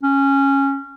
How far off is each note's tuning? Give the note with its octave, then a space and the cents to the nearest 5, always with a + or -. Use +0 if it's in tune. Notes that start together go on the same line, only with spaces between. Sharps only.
C#4 -10